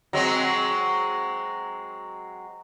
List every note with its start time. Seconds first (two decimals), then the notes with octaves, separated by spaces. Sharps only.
0.13 F#3 G#3 C4